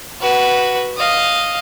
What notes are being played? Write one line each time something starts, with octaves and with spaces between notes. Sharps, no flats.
F#4 B4
D#5 F5